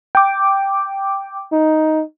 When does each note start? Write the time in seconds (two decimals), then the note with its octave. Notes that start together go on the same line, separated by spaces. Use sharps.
0.15 G5 D6
1.53 D#4